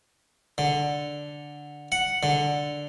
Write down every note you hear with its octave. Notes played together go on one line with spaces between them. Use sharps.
D3
F#5
D3